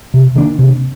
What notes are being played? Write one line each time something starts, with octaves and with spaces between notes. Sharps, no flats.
C3
D#3 A#3 D4
C3